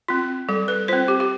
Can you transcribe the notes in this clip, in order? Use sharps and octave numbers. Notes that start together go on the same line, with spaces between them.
C4 F4
G3 A4
B4
C4 F4 C5
G4
G4